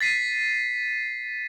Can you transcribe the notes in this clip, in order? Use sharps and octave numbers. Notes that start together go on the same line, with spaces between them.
A6 B6 C7 D#7